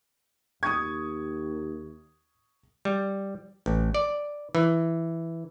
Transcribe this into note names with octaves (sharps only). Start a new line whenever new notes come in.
D#2 C#6 D#6 G#6
G3
A1
D5
E3